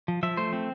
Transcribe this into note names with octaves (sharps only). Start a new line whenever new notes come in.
F3
F3 E5
A3 C5
C4